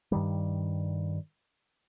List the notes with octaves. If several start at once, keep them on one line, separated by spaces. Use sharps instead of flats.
G2 D#3 G3